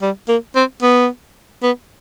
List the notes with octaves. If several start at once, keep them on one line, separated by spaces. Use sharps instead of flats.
G3
A#3
C4
B3
B3